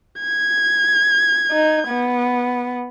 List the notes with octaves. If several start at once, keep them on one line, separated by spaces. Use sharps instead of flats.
G#6
D#4
B3